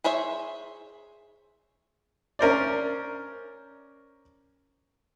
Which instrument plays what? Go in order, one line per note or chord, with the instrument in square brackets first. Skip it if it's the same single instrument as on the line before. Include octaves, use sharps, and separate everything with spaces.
[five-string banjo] G#4 C5 C#5 E5
[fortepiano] C#4 A#4 C5 D5